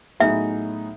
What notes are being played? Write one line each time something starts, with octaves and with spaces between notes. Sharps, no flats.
A2 F#3 B3 D#4 G#4 E5